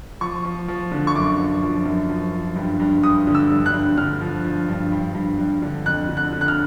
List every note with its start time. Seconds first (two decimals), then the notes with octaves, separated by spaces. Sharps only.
0.21 F3 C#6
0.45 F3
0.68 F3
0.92 D3
1.07 C#6
1.15 F#2 D6
1.38 F3
1.62 F3
1.86 F#2
2.09 F3
2.32 F3
2.56 G2
2.80 G2
3.03 G2 D#6
3.27 D3
3.35 E6
3.50 G2
3.66 F#6
3.74 G2
3.97 D3 F6
4.21 F3
4.44 F3
4.68 G2
4.92 G2
5.15 G2
5.39 G2
5.62 D3
5.85 F2 F#6
6.09 D3
6.17 F#6
6.32 D3
6.41 F#6
6.48 F6